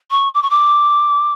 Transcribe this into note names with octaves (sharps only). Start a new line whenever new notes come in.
C#6
D6
C#6
D6